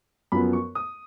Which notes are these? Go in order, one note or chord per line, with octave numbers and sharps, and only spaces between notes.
F#2 F3 B3 B5
C#6
D#6